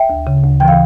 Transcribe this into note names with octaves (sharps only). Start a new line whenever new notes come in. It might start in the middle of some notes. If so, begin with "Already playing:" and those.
Already playing: E5 G5
D2
C#3
D2
E3 G5
F5